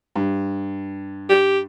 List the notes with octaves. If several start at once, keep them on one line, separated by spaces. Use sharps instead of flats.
G2
G4